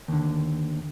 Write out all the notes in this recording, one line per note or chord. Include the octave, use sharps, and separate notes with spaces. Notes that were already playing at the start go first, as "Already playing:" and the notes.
D#2 D3